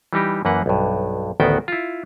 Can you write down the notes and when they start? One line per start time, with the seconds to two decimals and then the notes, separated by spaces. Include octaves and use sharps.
0.13 E3 G3 D#4 G4
0.45 F#2 E3 A#3 B4 F#5
0.66 B1 G2
1.40 A1 D2 D#3 B3 F#4 G5
1.68 E4 F4